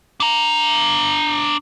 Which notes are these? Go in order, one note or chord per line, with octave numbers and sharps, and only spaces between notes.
D4 A#5